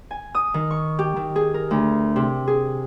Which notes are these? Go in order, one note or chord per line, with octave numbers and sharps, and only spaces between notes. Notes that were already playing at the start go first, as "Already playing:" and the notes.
G#5
D#6
D#3
C#6
G4
D#3
G#4
A#4
D2
C3
G#4